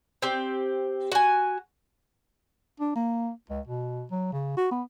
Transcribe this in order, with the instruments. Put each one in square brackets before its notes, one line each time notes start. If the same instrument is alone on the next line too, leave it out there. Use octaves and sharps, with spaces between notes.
[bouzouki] C4 G4
F#4 G#5
[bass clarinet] D4
A#3
C#2
B2
F#3
C#3
F#4
B3